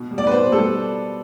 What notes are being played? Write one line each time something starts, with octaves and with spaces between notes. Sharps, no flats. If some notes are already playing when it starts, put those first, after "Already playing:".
Already playing: B2
G3
D5
B4
B2 C5
G3 A4